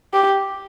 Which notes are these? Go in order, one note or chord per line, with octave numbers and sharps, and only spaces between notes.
G4